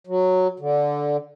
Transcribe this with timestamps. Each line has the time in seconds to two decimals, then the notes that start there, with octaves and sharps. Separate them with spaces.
0.07 F#3
0.60 D3